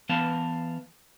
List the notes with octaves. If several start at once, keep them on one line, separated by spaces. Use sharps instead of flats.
E3 B3 F5 A5